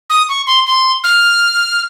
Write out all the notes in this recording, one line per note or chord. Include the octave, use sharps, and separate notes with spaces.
D#6
C#6
C6
C6
F6